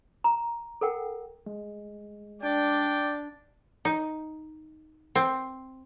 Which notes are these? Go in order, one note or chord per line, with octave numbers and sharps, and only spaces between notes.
A#5
A4 A#4 F#5 G5
G#3
D4 D5 G5
D#4
C4